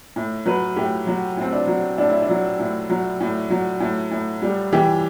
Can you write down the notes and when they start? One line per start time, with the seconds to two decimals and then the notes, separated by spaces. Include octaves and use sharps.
0.16 A2
0.46 F#3 B4
0.76 A2 G4
1.07 F#3 F#4
1.37 A2 C4
1.53 D4
1.67 F#3
1.98 A2 D4
2.10 E4
2.22 D4
2.29 F#3
2.60 A2
2.90 F#3
3.20 A2
3.50 F#3
3.80 A2
4.11 A2
4.42 G3
4.72 E3 G4